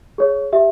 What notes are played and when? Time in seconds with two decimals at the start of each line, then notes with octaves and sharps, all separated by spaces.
0.18 G#4 C#5
0.53 G4 E5